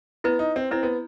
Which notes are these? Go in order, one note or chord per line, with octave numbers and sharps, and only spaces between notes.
B3 E4 B4 D#5
D#4
C4
C4 E4 B4 D#5
B3